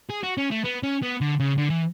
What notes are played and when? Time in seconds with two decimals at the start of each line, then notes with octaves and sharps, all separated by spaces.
0.09 G#4
0.23 F#4
0.38 C#4
0.51 A3
0.64 B3
0.83 C#4
1.02 B3
1.21 D3
1.40 C#3
1.58 D3
1.70 E3